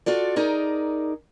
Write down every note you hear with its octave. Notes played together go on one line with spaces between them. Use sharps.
F4 F#4 A4 D5
D#4 G#4 A#4 D5